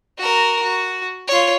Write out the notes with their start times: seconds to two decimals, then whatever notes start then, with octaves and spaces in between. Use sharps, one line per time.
0.18 F#4 A#4
0.63 F#4
1.28 F4 C#5